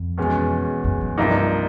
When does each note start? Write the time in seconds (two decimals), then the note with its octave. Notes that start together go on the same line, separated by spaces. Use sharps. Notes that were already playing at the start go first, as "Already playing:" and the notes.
Already playing: F2
0.18 E2 B2 G#3 C#4
0.84 F#2
1.01 F#2
1.18 C2 G2 C3 F3 A#3 D#4